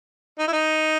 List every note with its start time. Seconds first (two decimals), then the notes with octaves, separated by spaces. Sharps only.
0.39 D#4
0.48 E4
0.53 D#4